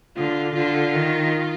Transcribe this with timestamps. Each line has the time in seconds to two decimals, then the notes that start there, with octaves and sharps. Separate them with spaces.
0.17 D3 F4
0.55 D3 F4
0.95 D#3